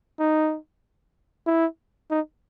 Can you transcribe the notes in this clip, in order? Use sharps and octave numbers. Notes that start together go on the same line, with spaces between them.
D#4
E4
D#4